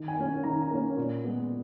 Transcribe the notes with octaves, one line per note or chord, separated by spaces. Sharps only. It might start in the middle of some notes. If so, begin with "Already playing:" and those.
Already playing: D#3
G#5
A#3 C#4
D#3 A#5
A#5
A#3 C#4
A#2
G#3 B3